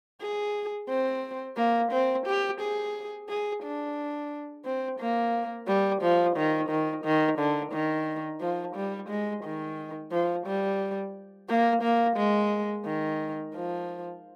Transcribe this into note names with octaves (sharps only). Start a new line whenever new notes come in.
G#4
C4
A#3
C4
G4
G#4
G#4
D4
C4
A#3
G3
F3
D#3
D#3
D#3
D3
D#3
F3
G3
G#3
D#3
F3
G3
A#3
A#3
G#3
D#3
F3